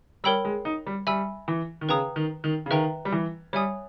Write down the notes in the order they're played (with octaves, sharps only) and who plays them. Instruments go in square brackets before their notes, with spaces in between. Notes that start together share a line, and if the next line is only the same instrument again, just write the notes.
[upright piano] G3 [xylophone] A#4 C#5 G5 B5 E6
[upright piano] G#3
D#4
G3
[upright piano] G3 [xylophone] E5 G#5 B5 E6
[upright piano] E3
D#3
[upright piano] C#3 [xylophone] B4 G5 A#5 D#6
[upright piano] D#3
D#3
C#3
[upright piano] D#3 [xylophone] B4 E5 G5 A#5
[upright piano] G3
E3
[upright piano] G3 [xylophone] C#5 E5 G#5 D#6